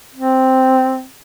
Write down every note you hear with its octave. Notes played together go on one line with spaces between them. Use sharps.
C4